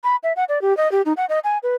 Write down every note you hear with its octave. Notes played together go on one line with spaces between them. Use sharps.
B5
E5
F#5
D5
G4
D#5
G4
D#4
F#5
D#5
G#5
B4